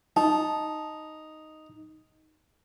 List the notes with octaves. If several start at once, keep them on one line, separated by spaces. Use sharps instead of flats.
D#4 A5